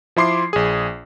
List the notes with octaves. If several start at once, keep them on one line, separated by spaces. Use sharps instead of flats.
F3 E4 C6 D6 C7
A#1 G#4